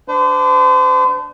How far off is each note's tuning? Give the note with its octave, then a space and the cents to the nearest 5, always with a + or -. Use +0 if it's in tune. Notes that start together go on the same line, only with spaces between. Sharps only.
D4 +0 C5 -40